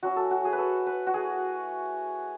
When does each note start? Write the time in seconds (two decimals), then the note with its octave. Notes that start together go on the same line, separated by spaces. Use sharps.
0.03 F#3 C#4 E4 F#4
0.16 A4
0.31 F#4
0.45 G#4
0.53 B4
0.58 A4
0.87 B4
1.07 F#4
1.14 A3 E4 G#4